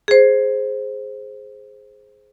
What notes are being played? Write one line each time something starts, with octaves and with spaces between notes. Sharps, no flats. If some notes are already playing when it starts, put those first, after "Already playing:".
G#4 C5